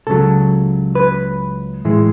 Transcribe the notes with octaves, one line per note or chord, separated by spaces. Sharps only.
C#2 C#3 F#3 A4
B4
A2 E3 G#3